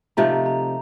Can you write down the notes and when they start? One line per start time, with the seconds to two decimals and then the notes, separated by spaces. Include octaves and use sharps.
0.17 C3 F3 A3 D#4 A#5
0.46 A#5